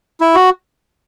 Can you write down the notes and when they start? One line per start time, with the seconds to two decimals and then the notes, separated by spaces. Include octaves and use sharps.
0.21 E4
0.35 F#4